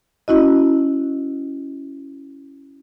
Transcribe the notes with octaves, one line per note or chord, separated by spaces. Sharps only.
C#4 E4 F#4 D#5